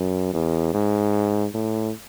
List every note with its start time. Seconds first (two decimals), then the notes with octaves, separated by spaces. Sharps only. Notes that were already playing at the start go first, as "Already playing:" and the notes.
Already playing: F#2
0.34 E2
0.74 G#2
1.54 A2